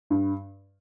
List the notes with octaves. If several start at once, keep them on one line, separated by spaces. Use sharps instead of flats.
G2